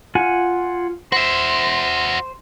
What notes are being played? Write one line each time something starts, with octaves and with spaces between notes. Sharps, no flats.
F4 F#5 G#5
F#4 C5 E5